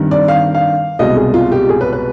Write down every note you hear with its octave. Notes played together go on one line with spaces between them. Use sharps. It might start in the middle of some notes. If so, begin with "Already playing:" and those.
Already playing: G2 D#3 G3 C4
D5
F5
F5
C2 B2 G#3 D#5
G#4
F4
G4
G#4
B4
B4